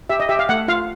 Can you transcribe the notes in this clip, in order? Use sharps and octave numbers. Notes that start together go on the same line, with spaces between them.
G4 E5
D#5
G4 E5
F5
A3 F#5
F4 F5